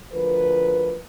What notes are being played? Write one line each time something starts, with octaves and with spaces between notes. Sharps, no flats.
D2 F3 A#4 B4